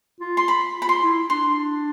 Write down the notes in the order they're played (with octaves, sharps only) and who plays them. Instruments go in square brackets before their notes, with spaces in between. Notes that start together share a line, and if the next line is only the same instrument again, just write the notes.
[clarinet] F4
[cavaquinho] C6
B5
[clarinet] F4
[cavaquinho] B5
C6
[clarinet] E4
[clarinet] D4 [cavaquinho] C6